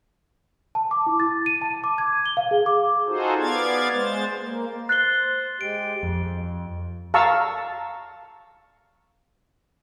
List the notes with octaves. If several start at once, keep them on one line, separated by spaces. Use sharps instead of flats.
A5
D6
E4
A6
D#7
A5
D6
G#6
G7
F5
G#4
D6
D#4 F4 F#4 G#4 A4 C5
B3 D5 F5 G#6 A6
G#3 C5 A6
A#3
C5 F#6 A6 C7 G7
G#3 G4 D7
F2
F5 A5 A#5 C#6 E6